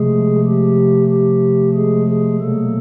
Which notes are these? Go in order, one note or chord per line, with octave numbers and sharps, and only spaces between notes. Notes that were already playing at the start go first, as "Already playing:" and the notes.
Already playing: C3 F3 G#3 A3 G#4
G4
G4
G#3 G#4
G#3 G#4
B2 F#3 A3 A#3 A4